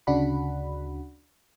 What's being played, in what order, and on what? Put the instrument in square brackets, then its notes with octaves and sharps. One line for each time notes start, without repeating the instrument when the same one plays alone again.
[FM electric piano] D2 C#3 D4 F#4 F#5 B5